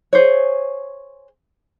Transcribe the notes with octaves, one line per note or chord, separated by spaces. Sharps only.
G#4 C5 C#5